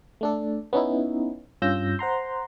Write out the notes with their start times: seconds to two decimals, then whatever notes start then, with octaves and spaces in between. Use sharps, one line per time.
0.21 A3 D4 A4
0.73 B3 C#4 D#4 E4
1.62 G2 C#4 F4 E6 G6 A#6
1.99 C5 F#5 A#5 C6